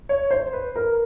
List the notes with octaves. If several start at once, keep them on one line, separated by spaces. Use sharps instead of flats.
C#5
C5
B4
A#4